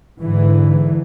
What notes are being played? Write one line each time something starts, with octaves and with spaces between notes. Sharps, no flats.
G#2 D3 E3